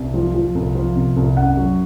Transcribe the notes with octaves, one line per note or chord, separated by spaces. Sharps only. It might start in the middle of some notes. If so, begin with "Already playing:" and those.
Already playing: C2
F3
F3
C2
F3
C3
C2
F#2 F#5
F#3